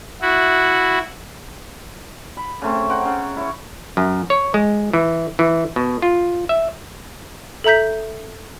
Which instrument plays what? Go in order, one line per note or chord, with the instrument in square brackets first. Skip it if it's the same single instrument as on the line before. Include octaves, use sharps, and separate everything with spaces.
[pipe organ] E4 F#4
[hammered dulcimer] B5
C#3 A3 C4
C5 F#5 G5 A#5
C#3
E4 C#5
[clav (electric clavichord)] F#2
C#5
G#3
E3
E3
B2
F4
E5
[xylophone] A4 E5 A#5 G6 B6